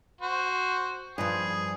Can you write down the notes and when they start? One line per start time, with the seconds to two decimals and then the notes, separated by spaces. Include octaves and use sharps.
0.21 F#4 C5
1.18 G2 F3 G#4